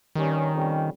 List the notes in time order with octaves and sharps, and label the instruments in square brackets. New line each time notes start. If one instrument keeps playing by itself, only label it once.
[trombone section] G2 G3 C#4 [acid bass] D#3
[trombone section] F2 C3 G3 C#4